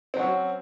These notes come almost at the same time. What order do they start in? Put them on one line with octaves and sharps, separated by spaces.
C4 F#3 F#4 C#4